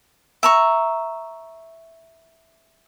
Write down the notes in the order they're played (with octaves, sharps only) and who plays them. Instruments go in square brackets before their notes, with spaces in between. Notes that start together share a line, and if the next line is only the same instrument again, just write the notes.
[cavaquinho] E5 A#5 C#6